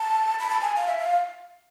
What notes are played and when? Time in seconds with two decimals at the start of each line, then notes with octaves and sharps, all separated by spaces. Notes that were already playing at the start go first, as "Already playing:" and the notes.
Already playing: A5
0.39 B5
0.50 A5
0.61 G#5
0.76 F5
0.87 E5
0.98 F5